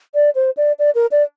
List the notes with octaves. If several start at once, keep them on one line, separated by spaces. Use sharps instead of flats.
D5
C5
D5
D5
A#4
D5